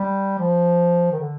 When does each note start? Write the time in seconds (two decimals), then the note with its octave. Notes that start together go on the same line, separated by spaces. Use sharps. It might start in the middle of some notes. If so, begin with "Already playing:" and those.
Already playing: G3
0.39 F3
1.12 D#3
1.20 D3